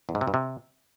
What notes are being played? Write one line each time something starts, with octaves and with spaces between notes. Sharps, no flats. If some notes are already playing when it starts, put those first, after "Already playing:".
E2
G#2
C3
G2
C3